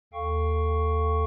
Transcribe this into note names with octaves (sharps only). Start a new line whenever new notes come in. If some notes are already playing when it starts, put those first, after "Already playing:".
D#2 A4 F5 G5 C#6